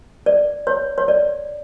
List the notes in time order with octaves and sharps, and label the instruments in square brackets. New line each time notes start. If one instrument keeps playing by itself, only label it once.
[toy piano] D5
C#5
C#5
D5